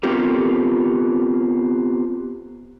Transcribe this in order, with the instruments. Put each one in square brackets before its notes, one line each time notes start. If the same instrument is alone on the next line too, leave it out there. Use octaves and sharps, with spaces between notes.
[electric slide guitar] B3 C4 F4 G4 A4 A#4